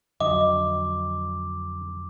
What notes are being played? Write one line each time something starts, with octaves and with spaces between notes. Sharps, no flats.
F2 D3 F#3 D#5 D6